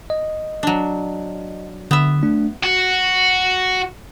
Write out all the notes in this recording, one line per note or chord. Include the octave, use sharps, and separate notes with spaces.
D#5
F#3 D4
D3 B3 E5
A3 D4
F#4